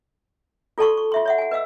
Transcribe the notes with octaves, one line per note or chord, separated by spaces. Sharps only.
F4 A4 D5 A5 C6 C#6
C#6
F4 E5 C6
C#5 E5 F#5
F#5 G#5
B4 D#5 F5 E6